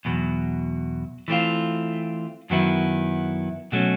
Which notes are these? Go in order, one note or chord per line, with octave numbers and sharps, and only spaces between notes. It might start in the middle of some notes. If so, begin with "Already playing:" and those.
E2 B2 F#3
E3 A3 C4 F4
F#2 D#3 F#3 B3 E4
B2 F#3 A3 C#4